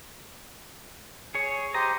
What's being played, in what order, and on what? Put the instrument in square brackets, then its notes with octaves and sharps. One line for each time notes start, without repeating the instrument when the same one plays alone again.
[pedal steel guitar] G#4 C#5
[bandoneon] G4 C5 [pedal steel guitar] D#5 A#5